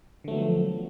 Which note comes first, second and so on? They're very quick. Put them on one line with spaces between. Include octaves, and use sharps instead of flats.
D3 A3 F#3 B3 F3